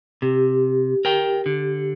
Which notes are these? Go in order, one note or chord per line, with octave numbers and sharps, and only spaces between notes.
C3 G4
A#4 G5
D3